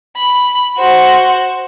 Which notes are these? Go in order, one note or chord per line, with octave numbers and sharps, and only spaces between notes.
B5
F#4 C5